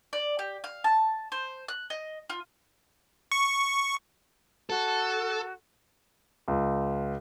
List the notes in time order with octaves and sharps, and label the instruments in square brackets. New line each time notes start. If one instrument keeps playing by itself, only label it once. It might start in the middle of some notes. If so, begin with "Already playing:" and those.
[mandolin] D5
G4
F5
A5
C5
F#6
D#5
F4
[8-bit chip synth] C#6
[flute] F#4 [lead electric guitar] A4
[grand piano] C#2